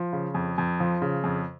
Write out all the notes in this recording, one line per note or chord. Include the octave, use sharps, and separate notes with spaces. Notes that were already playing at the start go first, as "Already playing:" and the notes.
Already playing: F3
C#3
F2
F2
F3
C#3
F2